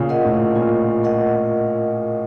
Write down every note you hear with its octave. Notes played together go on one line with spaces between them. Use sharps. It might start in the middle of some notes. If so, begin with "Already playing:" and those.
Already playing: A#2 C#3 F4
A#4 D#5 F#5
A2
A#2 F4
A#4 D#5 F#5